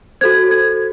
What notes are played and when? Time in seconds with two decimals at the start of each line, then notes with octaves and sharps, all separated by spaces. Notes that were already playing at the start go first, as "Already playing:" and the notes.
0.21 F#4 A4 C5 G#6
0.51 G#6